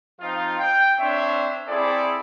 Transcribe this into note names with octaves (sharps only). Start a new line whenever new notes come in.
F3 C4 D#4 F4
G5
C4 D4 C5 C#5 E5
C4 E4 G#4 A4 D5